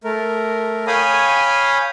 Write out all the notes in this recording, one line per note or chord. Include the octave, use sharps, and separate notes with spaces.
A3 A#4
C#5 F5 G5 G#5 B5 D#6